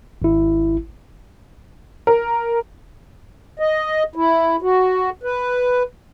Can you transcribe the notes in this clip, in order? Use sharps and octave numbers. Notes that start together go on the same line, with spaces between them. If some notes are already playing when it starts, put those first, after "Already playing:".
G#1 E4
A#4
D#5
E4
F#4
B4